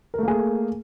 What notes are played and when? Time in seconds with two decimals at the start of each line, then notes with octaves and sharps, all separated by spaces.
0.14 A#4
0.18 A3
0.23 A#3
0.28 G#4